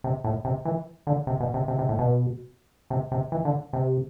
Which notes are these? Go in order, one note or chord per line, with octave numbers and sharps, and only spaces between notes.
C3
A2
C3
E3
D3
C3
B2
C3
C3
C3
A2
B2
C3
C3
E3
D3
C3